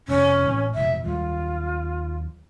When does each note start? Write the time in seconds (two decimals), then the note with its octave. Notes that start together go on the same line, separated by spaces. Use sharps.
0.08 F1 F2 B2 C#4
0.46 A1 A2 C4
0.75 F1 G#2 B2 E5
1.04 D#2 F#3 G3 F4